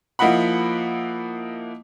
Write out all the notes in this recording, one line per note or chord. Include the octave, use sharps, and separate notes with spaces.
F3 A#3 E4 D#5 F#5 B5